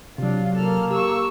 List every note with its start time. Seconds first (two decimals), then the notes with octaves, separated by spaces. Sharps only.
0.18 C3 F#3 D4 F4
0.55 A#3 A4 F6
0.91 G4 C#6 E6